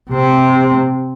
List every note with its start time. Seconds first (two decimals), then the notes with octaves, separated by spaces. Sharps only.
0.10 C3 C4